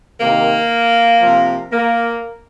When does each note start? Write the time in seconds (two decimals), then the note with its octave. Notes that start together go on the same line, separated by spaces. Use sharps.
0.20 C3 D#3 A#3
1.21 C3 F3
1.72 A#3